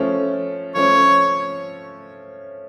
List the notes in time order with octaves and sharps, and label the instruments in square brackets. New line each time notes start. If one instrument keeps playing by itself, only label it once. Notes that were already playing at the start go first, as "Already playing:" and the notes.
Already playing: [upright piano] F3 A3 C#4
[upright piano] F3 A3 C#4 [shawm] C#5